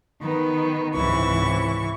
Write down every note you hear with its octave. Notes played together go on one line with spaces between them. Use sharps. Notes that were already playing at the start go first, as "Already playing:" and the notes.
D#3 B3
C#2 G#2 C3 E3 E4 C#6